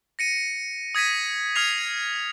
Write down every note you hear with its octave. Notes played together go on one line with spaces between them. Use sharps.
A#6 C#7 D#7
D#6 G#6 A#6 B6 D#7
D#6 F6 G#6 C7 F7